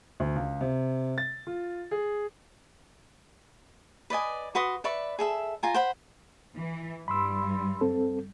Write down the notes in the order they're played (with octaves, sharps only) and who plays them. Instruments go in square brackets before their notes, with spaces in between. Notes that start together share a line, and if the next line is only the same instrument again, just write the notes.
[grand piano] D2
C#2
C3
A6
F4
G#4
[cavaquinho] B4 D5 D#5 G#5
F#4 B4 C6 D#6
B4 D5 E5 C#6
G#4 A4 E5
F4 G#5 A#5
C5 F#5 B5
[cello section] E3
[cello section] G2 G3 [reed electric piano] B5 C6 E6
[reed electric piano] C4 A4